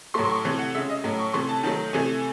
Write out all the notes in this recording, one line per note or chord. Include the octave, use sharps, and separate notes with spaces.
A2 F#3 A3 C6
C6
C#6
C3 E3 A3
F#5
C#3 G#3 E5
D#5
A2 F#3 A3
C#6
C3 E3 A3 C6
A5
D#3 F#3 A3 A5
C3 E3 A3 G#5